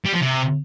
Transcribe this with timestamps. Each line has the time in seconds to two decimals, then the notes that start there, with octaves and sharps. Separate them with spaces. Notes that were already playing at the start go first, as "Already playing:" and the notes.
0.05 G3
0.13 F3
0.21 C3